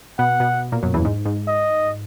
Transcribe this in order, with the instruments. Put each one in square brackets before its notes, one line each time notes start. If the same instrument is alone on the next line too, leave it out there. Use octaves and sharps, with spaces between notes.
[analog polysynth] B2 B3 [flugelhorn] F#5
[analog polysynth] B2 B3
A#2 A#3
F#2 F#3
E2 E3
G#2
G#2
[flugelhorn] D#5